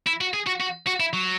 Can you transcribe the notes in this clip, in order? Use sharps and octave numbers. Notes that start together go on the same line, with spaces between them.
E4
F#4
G#4
F#4
F#4
F#4
E4
F#3